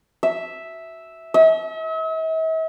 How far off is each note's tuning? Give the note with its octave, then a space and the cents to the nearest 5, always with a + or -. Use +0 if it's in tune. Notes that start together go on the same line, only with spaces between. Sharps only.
E5 -5
E5 -45